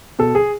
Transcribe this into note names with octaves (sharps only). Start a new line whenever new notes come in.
B2 A4
G#4